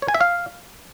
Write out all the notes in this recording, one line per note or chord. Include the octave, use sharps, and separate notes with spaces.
C#5
G#5
E5
F5